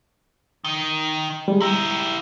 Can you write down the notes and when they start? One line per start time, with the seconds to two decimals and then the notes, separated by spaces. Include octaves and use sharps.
0.64 D#3 D#4
1.48 G3 G#3
1.62 E4 G4 A#5